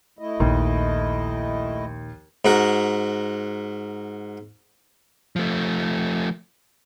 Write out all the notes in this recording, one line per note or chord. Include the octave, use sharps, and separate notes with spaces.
A3 E4 D#5
A#1 D#2
G#2 F#4 A#4
F3 A3